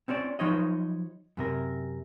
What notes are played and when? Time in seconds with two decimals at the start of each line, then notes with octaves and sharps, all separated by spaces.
0.08 C4 C#4 C5 D5
0.39 F3 F#3 D#4 C5 C#5 D#5
1.37 F#2 C3 A#4